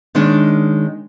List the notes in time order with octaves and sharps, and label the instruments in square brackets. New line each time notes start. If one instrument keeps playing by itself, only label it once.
[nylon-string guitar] D#3 G#3 C#4 D4